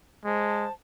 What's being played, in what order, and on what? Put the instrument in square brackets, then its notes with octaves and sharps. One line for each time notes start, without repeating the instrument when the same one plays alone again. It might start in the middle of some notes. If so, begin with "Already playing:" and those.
[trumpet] G#3 [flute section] C5 A5